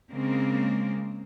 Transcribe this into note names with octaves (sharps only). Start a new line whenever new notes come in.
C#3 G#3 A#3 C4